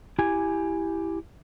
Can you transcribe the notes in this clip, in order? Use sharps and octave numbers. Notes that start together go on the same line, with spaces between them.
E4 G4 G#5